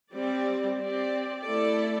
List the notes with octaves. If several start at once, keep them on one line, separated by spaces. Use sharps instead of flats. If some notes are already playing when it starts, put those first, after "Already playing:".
G3 C4 G4 D5
C4 G4 D5
A3 E4 A4 D5